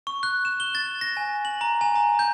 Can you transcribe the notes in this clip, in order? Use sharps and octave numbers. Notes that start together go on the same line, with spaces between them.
C#6
F#6
E7
G7
A6
A#6
G#5
F#7
A#5
G#5
A#5
G6